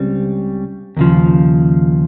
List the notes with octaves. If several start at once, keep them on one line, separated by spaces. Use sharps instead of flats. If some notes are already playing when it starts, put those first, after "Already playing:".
Already playing: C#2 C#3 G3 C4
D#2 C#3 F3